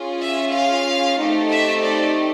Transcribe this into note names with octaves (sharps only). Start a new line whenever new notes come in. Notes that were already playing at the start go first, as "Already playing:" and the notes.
Already playing: C#4 F4 G#4
E5
F5
A3 C4 D#4 G4
E5
D5